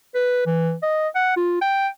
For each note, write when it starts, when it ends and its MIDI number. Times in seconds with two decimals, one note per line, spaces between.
0.15 0.45 71
0.46 0.74 52
0.82 1.08 75
1.15 1.33 78
1.36 1.60 65
1.61 1.88 79